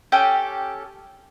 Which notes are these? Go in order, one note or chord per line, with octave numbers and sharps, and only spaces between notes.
C#4 G4 A4 G5